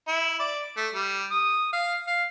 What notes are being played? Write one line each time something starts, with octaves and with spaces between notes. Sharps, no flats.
E4
D5
A3
G3
D#6
F5
F5